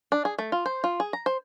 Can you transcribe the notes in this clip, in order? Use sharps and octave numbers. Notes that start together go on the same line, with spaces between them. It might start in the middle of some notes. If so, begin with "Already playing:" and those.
D4
G#4
A3
F4
C5
F4
G#4
A#5
C5